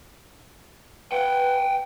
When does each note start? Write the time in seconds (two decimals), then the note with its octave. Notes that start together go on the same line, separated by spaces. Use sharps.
1.12 B4 F#5 G5